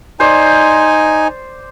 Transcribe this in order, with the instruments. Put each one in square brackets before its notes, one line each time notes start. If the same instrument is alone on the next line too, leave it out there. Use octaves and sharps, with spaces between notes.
[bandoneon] D#4 G#5 [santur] C5 D5